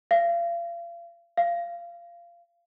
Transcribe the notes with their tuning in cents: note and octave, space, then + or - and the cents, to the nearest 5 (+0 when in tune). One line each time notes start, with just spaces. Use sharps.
F5 -35
F5 -20